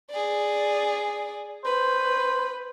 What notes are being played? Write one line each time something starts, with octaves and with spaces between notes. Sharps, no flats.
G#4 D5
B4 C5